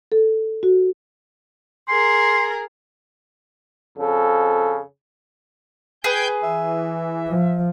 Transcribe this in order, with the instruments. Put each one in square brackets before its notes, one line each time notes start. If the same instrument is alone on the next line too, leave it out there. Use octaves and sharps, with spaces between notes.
[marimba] A4
F#4
[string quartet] G#4 A#4 [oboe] C6
[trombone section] F2 C#3 A4
[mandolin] G#4 B4 [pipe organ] G5 G#5 G6
[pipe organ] E3 [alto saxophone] E5
[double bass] F3